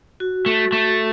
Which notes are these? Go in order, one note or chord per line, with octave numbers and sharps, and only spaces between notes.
F#4
A3
A3